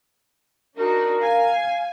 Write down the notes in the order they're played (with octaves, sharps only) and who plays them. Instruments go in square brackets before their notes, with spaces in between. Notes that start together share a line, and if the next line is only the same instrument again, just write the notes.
[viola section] D4 D#4 F#4 [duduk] A#4
[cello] F5 [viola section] G#5